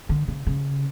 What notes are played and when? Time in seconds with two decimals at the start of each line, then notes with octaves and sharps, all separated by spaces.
0.09 D3
0.28 C#3
0.47 C#3